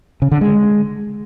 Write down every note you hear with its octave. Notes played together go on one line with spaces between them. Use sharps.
C#3
D3
G#3